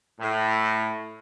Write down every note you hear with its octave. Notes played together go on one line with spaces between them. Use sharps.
A2